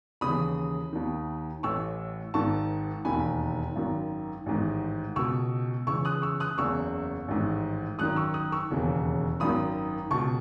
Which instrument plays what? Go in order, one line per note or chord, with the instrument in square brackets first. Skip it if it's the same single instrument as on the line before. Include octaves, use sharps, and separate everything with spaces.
[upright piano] D#2 C#3 E3 B5 D#6
D#2 D#3
A1 A2 E3 C#6 E6
G#1 G#2 D#3 A5 C#6
E1 D#2 D#3 G#5 B5
G#1 F#2 D#3
A1 G#2 D#3
C#2 B2 C#6 E6
C#2 C#3 E3 C#6 E6
D#6 F#6
C#6 E6
D#6 F#6
F#1 E2 C#3 C#6 E6
A1 G#2 D#3
G#1 F#2 D#3 D#6 F#6
C#6 E6
D#6 F#6
C#6 E6
E1 D#2 C#3 E3
G#1 F#2 D#3 B5 D#6
C#2 B2 A5 C#6